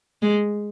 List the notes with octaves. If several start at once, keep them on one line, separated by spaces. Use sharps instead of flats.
G#3